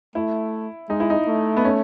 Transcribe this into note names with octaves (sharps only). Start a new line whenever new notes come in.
A3 E4
G#3 D#4
E4
D#4
A3
B3
C#4